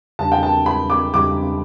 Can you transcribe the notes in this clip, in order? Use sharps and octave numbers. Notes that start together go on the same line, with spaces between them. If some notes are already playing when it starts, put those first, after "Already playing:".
E2 C#3 G3 D4 G4 A5
G5
A5
B5
D6
E2 C#3 G3 D4 G4 D6